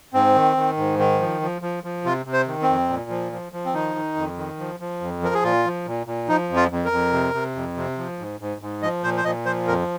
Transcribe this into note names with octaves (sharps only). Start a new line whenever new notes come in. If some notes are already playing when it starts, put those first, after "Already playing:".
G#2 C4
D#3
D#3
G#2
D#3
F3
F3
F3
F3
C3 F4
C3
C5
D#3
C4
F2
A#2
F3
F3
F3
C4
D#3 D#4
D#3
F2
D#3
F3
F3
F2
F3 A#4
G#4
A#2 F4
F3
A#2
A#2
F3 D#4
F2
F4
F2
A#4
F2
C3
C3
F2
C3
F3
G#2
G#2
G#2
F3 D#5
A#2 C5
C5
A#2 D#5
F3 C5
F2 A#4